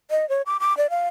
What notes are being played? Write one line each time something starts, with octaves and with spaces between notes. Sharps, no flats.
D#5
C#5
D6
D6
D5
F5